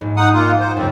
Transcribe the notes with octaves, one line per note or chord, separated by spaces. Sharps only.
A#1 G#2
D#4 F#5 C6 D#6
A#3 F4
C5
C#2 F#2 C4